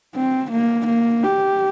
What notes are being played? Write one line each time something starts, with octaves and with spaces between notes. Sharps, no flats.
C4
A#3
A#3
G4